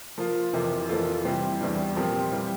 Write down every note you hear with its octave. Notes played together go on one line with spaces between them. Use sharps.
F3 A#3 F4
F2 C3 E3 A#3
F2 E3 A#3 F4 A4
C3 E3 G3 C4 G4
E2 E3 G3 D4
A#2 F3 C4 G4 A#4
E3 G3